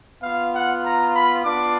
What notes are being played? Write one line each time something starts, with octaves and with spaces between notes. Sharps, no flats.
B3 F4 F5
F#5
A#5
B5
B3 D4 F4 D6